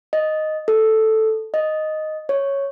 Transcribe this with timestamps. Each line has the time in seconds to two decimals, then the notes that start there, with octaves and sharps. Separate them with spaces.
0.13 D#5
0.68 A4
1.54 D#5
2.29 C#5